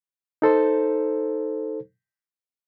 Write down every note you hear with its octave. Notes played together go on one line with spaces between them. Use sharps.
D#4 A4 C5